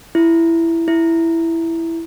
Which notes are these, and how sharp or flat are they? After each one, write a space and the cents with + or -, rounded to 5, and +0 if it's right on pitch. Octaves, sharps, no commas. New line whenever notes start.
E4 +10
E4 +5